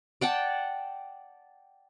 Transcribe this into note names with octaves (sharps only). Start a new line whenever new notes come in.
D5 F#5 G5 A5